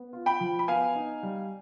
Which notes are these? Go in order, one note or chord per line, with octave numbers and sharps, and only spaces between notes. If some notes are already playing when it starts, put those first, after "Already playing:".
Already playing: B3
F4
G5 B5
F3
B5
B3 F5 G#5
D#4
G3